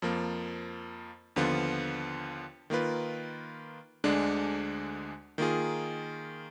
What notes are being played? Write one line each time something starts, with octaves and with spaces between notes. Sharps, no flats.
F2 F3 A#3
D#2 D3 F3 B3 F4
D#3 A#3 F4 B4
D2 D3 G#3 D4
D#3 A#3 F4 G#4